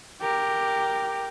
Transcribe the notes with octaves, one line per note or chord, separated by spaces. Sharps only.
G4 A#4